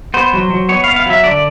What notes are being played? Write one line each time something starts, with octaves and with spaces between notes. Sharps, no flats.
B3 C5
F#3
F#3
B3 C#5
F5
B3
F5
F#3 E5
D3 D5